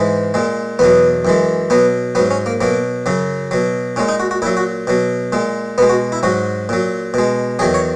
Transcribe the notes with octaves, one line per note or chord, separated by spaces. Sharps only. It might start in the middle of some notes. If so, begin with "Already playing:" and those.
Already playing: G#2 E3 G#3
A#2 G#3
E2 B2 F#3 B3
F#2 E3 G#3
B2 F#3 B3
G#2 F#3 B3
C#4
A#3
B2 F#3 A#3
F#2 C#3 F#3
B2 F#3
A#2 G#3 C#4
D#4
F#4
F#4
A#2 F#3 E4
F#4
B2 F#3
A#2 G#3
B2 G#3 B3
F#4
E4
G#2 F#3 F#4
A#2 F#3
B2 G#3
E2 D#3 F#3 G#4
C#5